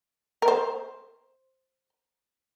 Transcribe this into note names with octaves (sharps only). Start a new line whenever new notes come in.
A#4
C5